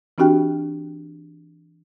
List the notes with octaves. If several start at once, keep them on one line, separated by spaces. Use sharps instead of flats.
E3 C4 D4 F#4 G4 G5